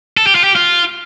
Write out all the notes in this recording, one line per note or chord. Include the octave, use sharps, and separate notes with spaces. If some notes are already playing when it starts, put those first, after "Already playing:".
A4
G4
F4
G4
F4